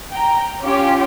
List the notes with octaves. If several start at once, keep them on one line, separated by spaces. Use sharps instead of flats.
G5 A#5
C#4 F4 G4